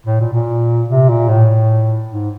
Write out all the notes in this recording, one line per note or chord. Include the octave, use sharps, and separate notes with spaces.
A2
A#2
A#2
C3
A#2
A2
G#2